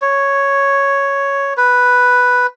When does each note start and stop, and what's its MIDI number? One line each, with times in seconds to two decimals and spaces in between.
0.02 1.54 73
1.57 2.47 71